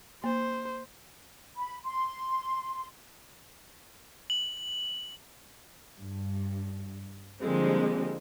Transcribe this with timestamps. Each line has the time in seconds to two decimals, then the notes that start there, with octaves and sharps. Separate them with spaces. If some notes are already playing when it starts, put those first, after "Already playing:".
0.24 A#3 C5
1.56 B5
1.84 C6
4.30 F#7
6.00 G2
7.42 D3 F3 G3 G#3 A#3 C4